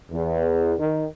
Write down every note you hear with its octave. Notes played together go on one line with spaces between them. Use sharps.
E2
D#3